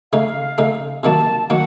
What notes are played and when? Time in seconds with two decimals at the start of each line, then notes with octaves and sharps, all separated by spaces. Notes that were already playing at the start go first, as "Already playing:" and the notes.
0.13 C#3 A3 D#4 F5
0.58 C#3 A3 D#4
1.03 C3 D#3 F#3 A#3 A5
1.50 D#3 F#3 A#3 F#5